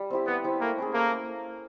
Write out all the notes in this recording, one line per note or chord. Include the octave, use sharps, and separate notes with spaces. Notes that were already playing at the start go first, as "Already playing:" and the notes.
Already playing: G3
C4 E4 G4
G3 B3
C4 E4 G4
A3 A#3
C#4 E4 G#4
A3 A#3